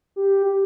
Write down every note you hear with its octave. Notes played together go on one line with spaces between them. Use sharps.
G4